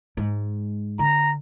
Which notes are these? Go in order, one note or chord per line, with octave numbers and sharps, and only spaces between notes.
G#2 G#3
D3 A#5